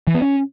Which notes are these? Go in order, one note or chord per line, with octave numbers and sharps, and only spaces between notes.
E3
B3
C#4